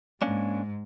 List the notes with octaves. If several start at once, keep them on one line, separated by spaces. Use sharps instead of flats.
G#2 G#3 A#3 C#4 D4